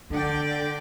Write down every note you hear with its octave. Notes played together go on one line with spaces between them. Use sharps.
D3 D4 A4 D5 G5